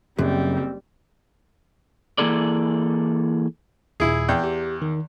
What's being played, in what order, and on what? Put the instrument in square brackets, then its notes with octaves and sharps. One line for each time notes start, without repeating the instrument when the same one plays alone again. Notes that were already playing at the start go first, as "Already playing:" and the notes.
[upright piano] F#1 [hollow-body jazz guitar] F#2 [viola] G3 [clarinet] C4
[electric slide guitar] E3 A#3 E4 G#4 A4 D5
[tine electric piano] D#2 A#2 [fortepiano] E4 G#4
[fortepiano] E2 G5
[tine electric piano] G4
D#3